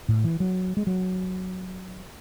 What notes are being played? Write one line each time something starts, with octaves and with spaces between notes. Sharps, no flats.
A2
E3
F#3
G#3
F#3